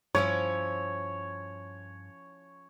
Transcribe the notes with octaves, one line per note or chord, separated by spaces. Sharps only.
G2 F3 C#4 E4 C#5